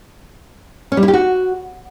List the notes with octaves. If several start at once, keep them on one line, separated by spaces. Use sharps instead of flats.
C#4
G3
E4
G4
F#4